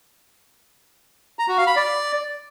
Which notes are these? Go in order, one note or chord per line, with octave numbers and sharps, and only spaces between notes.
A#5
F#4
F5
B5
D5